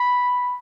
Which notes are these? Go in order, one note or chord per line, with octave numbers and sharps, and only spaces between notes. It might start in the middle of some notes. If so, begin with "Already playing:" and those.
Already playing: B5